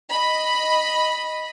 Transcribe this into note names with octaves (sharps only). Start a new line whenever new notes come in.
D#5 B5